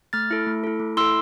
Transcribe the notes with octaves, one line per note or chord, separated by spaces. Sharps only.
A3 F6 A6
E4 A4
A3
E4 A4
A3
E4 A4 C6 E6